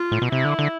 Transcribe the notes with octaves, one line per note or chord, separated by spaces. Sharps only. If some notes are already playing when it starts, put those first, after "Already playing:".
Already playing: F4
A2
B2
C3 E4
D3
D3